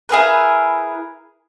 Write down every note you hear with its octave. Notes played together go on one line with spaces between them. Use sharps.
E4 G#4 A#4 B4